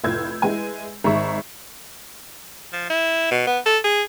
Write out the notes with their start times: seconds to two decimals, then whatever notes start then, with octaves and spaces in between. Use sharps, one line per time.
0.04 F1 A2 F4 E6 G6 G#6
0.42 G#3 E4 B4 G#5
1.04 G#1 G#2 G#4 E5 A#5 C#6
2.73 F3
2.90 E4
3.32 B2
3.47 B3
3.66 A4
3.84 G#4